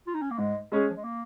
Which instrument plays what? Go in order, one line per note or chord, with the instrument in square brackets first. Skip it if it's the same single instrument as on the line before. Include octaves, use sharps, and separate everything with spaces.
[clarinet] F4
D#4
C#4
A#3
[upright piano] G#2 [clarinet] G#3
[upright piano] G#3 C#4 G#4
[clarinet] F3
G#3
A#3